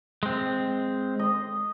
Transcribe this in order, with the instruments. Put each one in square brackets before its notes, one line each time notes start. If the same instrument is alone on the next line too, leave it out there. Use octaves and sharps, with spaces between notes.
[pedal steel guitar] G#3 C4
[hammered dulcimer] C5 D#5